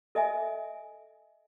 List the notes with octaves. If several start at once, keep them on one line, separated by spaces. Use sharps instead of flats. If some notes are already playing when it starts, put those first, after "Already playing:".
A4 D#5 E5 G#5